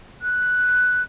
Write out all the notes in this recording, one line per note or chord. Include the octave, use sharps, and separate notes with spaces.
F#6